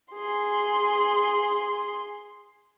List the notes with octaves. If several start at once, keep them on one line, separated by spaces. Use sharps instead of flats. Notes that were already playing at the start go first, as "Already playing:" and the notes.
G#4 C6